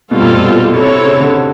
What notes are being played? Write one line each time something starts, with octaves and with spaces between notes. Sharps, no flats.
B2 G3 C4 F4 A4
A#2
A#2
B2
C3 C4 E4 A4 C#5
C3
C#3
D3